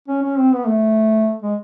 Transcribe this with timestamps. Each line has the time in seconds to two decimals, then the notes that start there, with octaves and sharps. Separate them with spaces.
0.08 C#4
0.23 C#4
0.38 C4
0.53 B3
0.67 A3
1.42 G#3